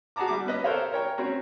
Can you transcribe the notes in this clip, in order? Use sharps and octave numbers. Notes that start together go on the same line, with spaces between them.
F#4 G#4 F#5 A5 A#5 D6
G3 E5 D6
B3 C#4 B4 D#5
G4 A4 A#4 C5 C#5 F5
A#4 C#5 G5
C4 C#4 F#4 A#5